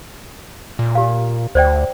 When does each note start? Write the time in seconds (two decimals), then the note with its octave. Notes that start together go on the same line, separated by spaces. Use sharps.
0.79 A#2
0.95 G4 F5
1.55 D2 C5 D5 G5